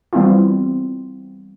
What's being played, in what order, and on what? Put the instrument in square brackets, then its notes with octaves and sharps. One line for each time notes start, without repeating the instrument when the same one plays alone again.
[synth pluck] E3 G3 B3 C4 E4 F4